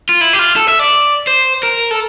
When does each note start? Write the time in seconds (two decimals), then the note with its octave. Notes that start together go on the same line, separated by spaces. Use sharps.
0.09 F4
0.21 E4
0.33 G4
0.39 F4
0.56 A4
0.68 E5
0.80 D5
1.27 C5
1.63 A#4
1.91 A4